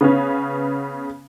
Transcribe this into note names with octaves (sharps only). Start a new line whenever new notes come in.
C#3 B3 C#4